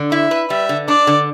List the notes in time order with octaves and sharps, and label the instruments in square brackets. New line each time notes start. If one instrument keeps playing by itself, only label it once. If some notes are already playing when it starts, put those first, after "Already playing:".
Already playing: [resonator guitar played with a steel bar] D3
[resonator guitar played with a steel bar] E4 [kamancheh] E5
[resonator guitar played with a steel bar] B4
[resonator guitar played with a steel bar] G3 [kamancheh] E5
[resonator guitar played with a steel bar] D3
[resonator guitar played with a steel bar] D4 [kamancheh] D5
[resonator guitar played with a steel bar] D3